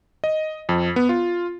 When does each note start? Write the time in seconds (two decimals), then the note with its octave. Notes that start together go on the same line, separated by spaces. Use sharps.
0.24 D#5
0.69 F2
0.96 B3
1.09 F4